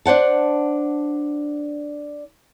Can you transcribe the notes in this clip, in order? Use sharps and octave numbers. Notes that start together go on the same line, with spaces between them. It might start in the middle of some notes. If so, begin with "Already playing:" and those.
D4 C5 F#5 A5